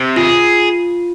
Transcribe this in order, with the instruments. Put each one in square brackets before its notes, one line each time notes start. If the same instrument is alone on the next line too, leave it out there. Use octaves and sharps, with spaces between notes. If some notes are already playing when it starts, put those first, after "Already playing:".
Already playing: [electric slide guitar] C3
[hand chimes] F4 [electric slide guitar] G#4